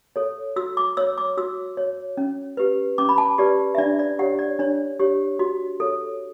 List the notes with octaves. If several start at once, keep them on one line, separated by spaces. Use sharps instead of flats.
A4 C#5
F#4 E6
D6
C#5 E6
D6
F#4 E6
C#5
C#4
G4 B4
C#4 D6
B5
A5
G4 B4 D5
E5
D4 D5
D5
G4 C#5 F#5
D5
D4 C#5
G4 C#5
F#4
A4 C#5